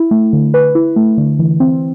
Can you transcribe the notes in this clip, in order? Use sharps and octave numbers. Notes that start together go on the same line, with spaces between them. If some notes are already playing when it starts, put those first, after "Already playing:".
Already playing: E4
A3
D3
B4
E4
A3
D3
E3
C4